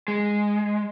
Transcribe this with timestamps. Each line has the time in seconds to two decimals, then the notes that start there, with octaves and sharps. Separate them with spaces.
0.08 G#3